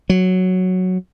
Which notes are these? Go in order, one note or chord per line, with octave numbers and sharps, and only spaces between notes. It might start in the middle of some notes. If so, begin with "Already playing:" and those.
F#3